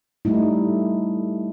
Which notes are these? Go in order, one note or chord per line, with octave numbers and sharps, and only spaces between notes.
G3 A3 D#4 E4